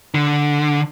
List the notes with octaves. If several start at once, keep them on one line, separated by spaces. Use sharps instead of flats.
D3